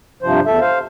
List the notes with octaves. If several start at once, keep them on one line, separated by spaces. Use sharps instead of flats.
G2 C3 F3 C5
E2 A4 E5
C5 F5